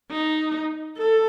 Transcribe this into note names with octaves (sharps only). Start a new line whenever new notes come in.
D#4
A4